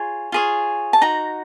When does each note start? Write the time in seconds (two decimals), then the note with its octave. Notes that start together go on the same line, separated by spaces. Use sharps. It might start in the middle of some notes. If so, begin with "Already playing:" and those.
Already playing: F4 G#4 C#5
0.32 F4 G#4 C#5
0.93 A5
1.01 D#4 F#4 A#5